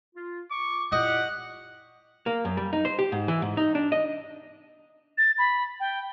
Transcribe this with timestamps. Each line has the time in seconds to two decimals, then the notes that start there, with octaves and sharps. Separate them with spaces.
0.16 F4
0.51 C#6 D6
0.92 A#2 E4 G4 D#5 F#5
2.26 A#3
2.45 F#2
2.57 G3
2.73 D#4
2.85 C5
2.99 G4
3.12 G#2
3.28 E3
3.42 G#2
3.57 D#4
3.75 D4
3.92 D#5
5.18 A6
5.38 B5
5.80 G5